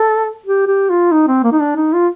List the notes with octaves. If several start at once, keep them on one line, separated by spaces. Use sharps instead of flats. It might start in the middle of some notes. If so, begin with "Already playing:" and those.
Already playing: A4
G4
G4
F4
D#4
C4
A#3
D#4
D4
D#4
F4